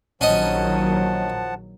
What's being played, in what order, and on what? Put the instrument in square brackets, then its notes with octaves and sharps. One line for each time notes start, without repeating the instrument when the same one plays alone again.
[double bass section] A#1 D#3 F#3 [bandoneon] F3 F#5 A5 [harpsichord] C#4 D#5